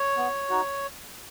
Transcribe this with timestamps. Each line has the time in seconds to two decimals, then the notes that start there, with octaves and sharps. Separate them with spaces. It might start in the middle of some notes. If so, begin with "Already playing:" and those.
Already playing: C#5
0.17 B3
0.49 D#4 F#4